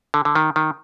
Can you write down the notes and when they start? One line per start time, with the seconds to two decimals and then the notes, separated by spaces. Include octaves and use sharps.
0.14 D3
0.25 D3
0.35 D#3
0.56 D#3